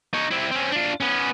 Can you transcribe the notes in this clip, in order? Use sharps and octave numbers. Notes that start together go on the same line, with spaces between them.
D#4 C#5
C4 E4
C4 C#4
D4 F4
B3 C#4